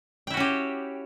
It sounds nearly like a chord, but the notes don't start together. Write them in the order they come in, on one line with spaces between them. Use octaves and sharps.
G5 E4 F#4 C#4 G4